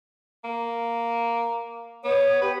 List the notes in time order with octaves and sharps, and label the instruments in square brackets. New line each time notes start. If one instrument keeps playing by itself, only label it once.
[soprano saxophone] A#3
[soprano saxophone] B3 [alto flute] C#5
[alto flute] G4 [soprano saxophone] B4